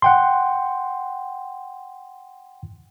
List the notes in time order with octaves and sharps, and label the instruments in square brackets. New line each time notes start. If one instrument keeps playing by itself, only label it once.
[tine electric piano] F#5 G5 C6